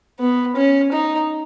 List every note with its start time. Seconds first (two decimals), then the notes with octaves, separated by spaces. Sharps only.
0.20 B3
0.56 C#4
0.92 D#4